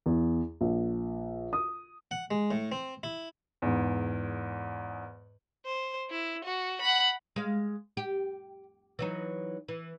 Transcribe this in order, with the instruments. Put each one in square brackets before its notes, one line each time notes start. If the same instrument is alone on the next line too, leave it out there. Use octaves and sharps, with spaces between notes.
[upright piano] E2
A#1
D#6
[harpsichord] F#5
G#3
A2
C4
E4
[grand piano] E2 G#2
[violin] C5
E4
F#4
F#5 B5
[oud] G#3 F5
G4
E3 F#3 D#4
E3